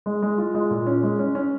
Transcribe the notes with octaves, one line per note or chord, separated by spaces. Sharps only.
G#3
G#3
F4
G#3
A#2
C#4
G#3
C#4
C#4